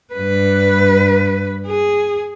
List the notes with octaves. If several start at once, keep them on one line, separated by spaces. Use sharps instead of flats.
G2 B4
G#4